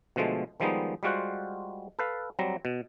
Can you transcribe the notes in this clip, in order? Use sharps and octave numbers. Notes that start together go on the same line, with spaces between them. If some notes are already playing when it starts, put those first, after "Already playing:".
B2 D3 F3 G#3 A3
D#3 F3 G3 G#3 B3 D#4
G3 G#3 F4 F#4 C5 F#5
A4 B4 F5
F#3 G3 C4 A#5
B2